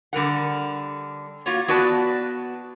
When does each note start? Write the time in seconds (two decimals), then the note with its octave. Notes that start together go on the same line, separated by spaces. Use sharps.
0.13 D3 G3 A#4 F#5
1.46 A#3 F4 F#4 C#5
1.68 B3 F#4 B4 D5 A5